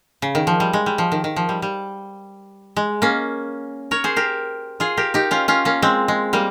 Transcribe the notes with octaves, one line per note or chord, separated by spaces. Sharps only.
C#3
D#3
F3
G3
G#3
G3
F3
D#3
D#3
F3
G3
G3
G#3
A#3 C#4
A#4 C#5
G#4 C5
G4 A#4
F4 G#4
G4 A#4
D#4 G4
C#4 F4
C#4 F4
A#3 C#4
G#3 C4
G#3
G3 A#3